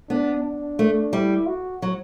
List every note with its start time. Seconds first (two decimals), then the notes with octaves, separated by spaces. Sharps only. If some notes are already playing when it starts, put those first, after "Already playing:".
0.10 B3 D4
0.44 D4
0.79 A3
1.13 G3 E4
1.47 F#4
1.82 F#3